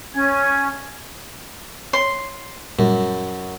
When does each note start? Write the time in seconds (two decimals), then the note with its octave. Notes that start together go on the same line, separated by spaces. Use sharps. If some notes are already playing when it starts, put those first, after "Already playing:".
0.14 C#4 G#5 G#6
1.93 C#5 C6
2.79 F#2 A#2 G3